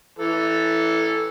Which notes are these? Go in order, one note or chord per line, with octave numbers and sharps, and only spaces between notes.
E3 A4